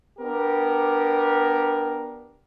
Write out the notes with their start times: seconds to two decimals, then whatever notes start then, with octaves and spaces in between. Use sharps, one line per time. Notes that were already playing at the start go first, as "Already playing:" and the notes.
0.20 B3 D4 G4 A#4